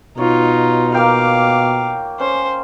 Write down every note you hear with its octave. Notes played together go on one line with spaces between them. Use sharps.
B2 D#4 F4 C#5
A#3 F5 G5 D6
C#4 C5